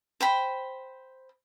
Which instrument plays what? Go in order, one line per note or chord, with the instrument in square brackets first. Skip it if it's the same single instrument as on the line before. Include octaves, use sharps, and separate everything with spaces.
[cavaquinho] C5 G5 B5